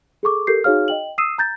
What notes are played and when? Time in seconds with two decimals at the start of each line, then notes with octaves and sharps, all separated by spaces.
0.23 G#4 A4 C#6 D6
0.47 G4 A4 A#4 G6 C7
0.64 D#4 F#4 G#4 C#5 F5 F6
0.88 D#5 G5 F#7
1.18 D#6 E6 C7 D#7 E7
1.38 A#5 G6 A6